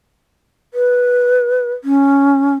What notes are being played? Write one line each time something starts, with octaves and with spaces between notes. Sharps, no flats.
B4
C#4